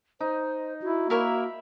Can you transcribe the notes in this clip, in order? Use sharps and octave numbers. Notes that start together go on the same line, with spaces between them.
D#4 C5
E4 F#4
A#3 E4 A#4 C#5 E5 B5